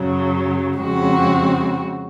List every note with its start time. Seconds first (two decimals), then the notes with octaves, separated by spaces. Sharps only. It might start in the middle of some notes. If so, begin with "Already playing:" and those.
Already playing: F#2 C#3 F#3
0.77 F2 C#3 G#3 C4 F#4